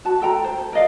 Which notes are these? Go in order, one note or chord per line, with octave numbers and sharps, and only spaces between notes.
F#4 A5
A4 G5 A#5
C5
A4
A#4 D5 D#5 F5